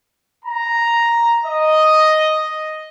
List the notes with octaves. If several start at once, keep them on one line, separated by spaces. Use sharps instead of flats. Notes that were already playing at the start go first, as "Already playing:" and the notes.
A#5
D#5